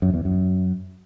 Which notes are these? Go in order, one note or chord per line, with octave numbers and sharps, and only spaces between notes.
F#2
E2
F#2